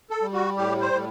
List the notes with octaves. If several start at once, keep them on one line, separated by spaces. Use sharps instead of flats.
A4
G3
F#4
A2 G4
C5
A2